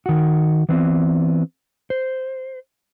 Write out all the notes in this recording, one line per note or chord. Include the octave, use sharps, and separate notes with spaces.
D#3 F#4
E3 B3 C4
C5